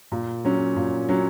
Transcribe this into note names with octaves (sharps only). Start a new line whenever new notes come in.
A#2
F#3 C#4
A#2
F#3 C#4